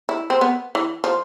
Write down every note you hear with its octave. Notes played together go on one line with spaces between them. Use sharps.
E4
C4
B3
E3
F3